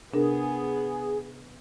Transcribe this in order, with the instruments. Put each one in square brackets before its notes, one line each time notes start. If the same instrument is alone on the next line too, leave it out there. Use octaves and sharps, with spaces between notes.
[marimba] C3 D4 A#4 [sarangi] B3 [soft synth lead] G#4